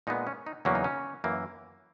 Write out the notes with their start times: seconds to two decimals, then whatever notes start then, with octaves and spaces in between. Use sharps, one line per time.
0.07 A#2 G#3 B3 D#4
0.27 C#4
0.47 D#4
0.65 E2 C#3 F#3 A#3 C#4
0.75 D#4
0.84 C#4
1.24 F#2 E3 A#3